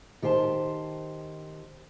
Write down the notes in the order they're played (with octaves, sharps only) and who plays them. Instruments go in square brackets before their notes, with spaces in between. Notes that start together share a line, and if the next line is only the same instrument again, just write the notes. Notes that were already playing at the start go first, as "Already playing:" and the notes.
[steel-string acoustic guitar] D#3 G4 C5 G#5 A5